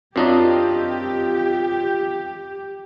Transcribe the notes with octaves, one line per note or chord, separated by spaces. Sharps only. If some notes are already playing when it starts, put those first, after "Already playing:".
F#2 C4 D4 D#4 F4 G4 D#5